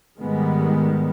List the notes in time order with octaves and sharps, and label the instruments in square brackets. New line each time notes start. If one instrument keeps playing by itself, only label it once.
[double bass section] G#2 D#3 G3 G#3 B3